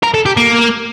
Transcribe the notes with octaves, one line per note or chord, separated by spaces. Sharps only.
A#4
A4
G4
A#3